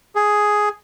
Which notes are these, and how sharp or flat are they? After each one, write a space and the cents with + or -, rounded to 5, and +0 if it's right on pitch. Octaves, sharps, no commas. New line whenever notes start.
G#4 +5